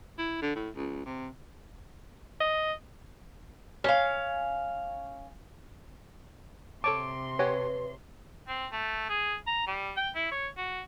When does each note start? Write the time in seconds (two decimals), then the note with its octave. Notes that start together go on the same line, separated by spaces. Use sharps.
0.18 E4
0.42 D3
0.56 A2
0.75 C#2
1.06 C3
2.40 D#5
3.84 C#4 F5
6.84 C3 A4 C#5 A5 C6 D6
7.39 G4 B4 C#5 F#5 G#5
8.48 C4
8.72 A3
9.09 G#4
9.47 A#5
9.67 G3
9.96 G5
10.15 E4
10.31 C#5
10.57 F#4